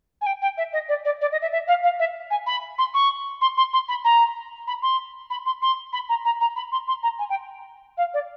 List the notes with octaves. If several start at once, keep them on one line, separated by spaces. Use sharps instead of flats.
G#5
G5
G5
E5
D#5
D5
D5
D5
D#5
E5
E5
F5
F5
E5
G#5
B5
C6
C#6
C6
C6
C6
B5
A#5
B5
C6
B5
C6
C6
B5
A#5
A#5
A#5
B5
C6
C6
A#5
G#5
G5
F5
D5